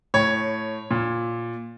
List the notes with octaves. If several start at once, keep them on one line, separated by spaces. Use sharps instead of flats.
A2 C#5
A#2